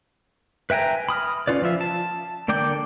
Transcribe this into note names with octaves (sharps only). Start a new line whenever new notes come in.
B4 E5 G5 G#5 A#5
B5 D#6 F6
C#4 F4 B4 D5
F3 F4 E5
A5
D3 A#3 D5 G5 D6